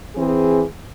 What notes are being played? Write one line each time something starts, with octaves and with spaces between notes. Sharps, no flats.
E3 C4 G#4